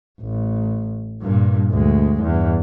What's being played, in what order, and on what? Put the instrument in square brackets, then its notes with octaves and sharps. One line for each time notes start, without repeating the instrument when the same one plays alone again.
[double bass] A1
G2 A#2
D2 G#3
E2 G2